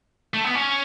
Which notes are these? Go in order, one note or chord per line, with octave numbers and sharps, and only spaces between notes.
A3
B3
C#4